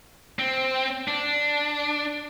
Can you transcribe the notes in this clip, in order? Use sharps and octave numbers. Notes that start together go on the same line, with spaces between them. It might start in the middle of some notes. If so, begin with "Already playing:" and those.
C4
D4